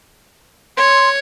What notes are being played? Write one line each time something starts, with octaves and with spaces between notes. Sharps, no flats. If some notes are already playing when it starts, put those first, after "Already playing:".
C#5 C6